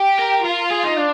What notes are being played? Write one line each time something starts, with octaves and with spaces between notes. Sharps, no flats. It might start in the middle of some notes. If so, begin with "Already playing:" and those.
Already playing: G4
A#4
F4 A#4
G#4
D#4
D4